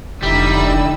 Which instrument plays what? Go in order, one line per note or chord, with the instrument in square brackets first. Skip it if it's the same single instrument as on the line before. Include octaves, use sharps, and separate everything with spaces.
[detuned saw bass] F1 [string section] D3 [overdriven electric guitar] G3 [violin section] D#4 E4 E6